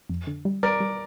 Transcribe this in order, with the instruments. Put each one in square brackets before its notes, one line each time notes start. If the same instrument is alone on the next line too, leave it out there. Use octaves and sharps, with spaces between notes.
[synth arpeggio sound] F2
D3
G3
[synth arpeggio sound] G3 [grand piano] A#4 D5
[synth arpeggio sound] G3